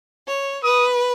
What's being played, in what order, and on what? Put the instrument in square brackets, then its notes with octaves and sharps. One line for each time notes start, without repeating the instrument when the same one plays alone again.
[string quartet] C#5
[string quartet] B4 [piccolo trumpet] D#6